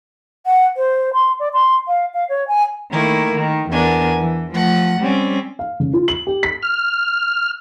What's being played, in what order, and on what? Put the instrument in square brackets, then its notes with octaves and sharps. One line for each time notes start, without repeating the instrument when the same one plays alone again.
[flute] F#5
C5
C6
D5
C6
F5
F5
C#5
G#5
[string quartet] D#3 A3 A#3 E4
D#3
E2 B3 D4 A#4 G#5
E3
F3 A3 F#5 A#6
G3 C4 C#4
[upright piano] F5
C#3
F4
F#7
G4
B6
[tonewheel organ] F6